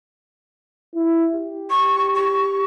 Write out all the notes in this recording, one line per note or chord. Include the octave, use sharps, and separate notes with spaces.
E4
G4
C#6
C#6